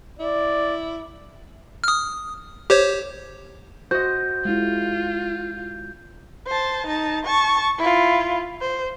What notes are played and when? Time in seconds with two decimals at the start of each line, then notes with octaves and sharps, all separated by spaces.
0.19 E4 D5
1.84 D#6 F6
2.70 G4 C5 C#5
3.91 F#4 C5 D#5 G6
4.45 G#3 E4 F4
6.47 C5 A5
6.87 D#4 A5
7.25 A5 C#6
7.78 E4 F4
8.61 C5